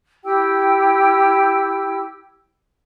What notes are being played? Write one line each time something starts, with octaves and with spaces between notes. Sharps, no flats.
E4 G4 G5 E6